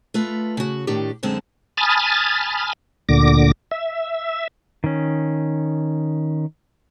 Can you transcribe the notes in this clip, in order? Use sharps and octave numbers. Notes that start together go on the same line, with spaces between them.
A3 F4 B4
C#3 F#4
A2 D#3 D4 G4
F#2 D3 G#3 C4 A5
G#5 A5 B5 D#6 F6 A6
D2 A#2 D3 D6 A#6
E5
D#3 C#4